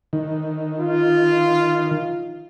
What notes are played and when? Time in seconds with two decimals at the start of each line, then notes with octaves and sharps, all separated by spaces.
0.13 D#3
0.80 F4